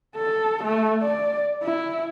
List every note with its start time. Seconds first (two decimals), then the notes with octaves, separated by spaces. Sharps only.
0.17 A4
0.64 A3
1.02 D5
1.63 E4